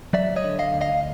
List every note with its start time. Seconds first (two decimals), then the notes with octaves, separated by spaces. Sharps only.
0.13 F#3 D5 E5
0.36 C#5 D#5
0.44 D3
0.59 D#5 F5
0.74 D2
0.81 D#5 F5